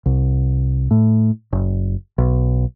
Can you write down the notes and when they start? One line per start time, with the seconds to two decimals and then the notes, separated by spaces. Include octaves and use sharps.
0.06 C2
0.91 A2
1.53 F#1
2.18 B1